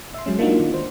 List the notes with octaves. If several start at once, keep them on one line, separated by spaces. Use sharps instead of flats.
E5 C6
F#3 G#3 C#4
A#3 D4 D#4 F4 F#4
D#3
C5